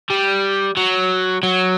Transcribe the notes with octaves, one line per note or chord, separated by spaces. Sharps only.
G3
F#3
F#3